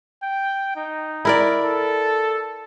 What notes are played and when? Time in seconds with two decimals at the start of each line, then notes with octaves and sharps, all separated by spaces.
0.23 G5
0.76 D#4
1.25 E4 A#4 D5
1.63 A4